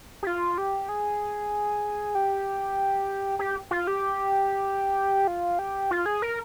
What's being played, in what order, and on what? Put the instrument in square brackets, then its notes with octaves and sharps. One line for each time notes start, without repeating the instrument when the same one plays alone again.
[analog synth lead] G4
F4
G4
G#4
G4
G4
F4
G4
F4
G4
F4
G#4
A#4